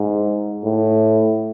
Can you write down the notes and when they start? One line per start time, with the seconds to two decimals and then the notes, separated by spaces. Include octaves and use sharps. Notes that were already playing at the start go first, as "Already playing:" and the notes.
Already playing: G#2
0.64 A2